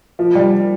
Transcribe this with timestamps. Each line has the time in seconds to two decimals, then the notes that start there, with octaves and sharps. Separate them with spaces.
0.19 F3
0.35 G3